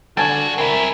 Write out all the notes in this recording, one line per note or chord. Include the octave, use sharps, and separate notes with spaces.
D3 G3 F#4 G#5 A5
C4 E4 A#4